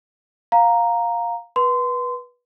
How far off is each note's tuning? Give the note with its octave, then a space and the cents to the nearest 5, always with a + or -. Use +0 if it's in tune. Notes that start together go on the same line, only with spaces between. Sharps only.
F5 +10 A#5 +0
B4 -20 C6 -25